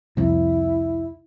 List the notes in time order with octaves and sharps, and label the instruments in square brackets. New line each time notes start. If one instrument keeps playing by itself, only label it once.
[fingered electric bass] C2 F2 [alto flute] E4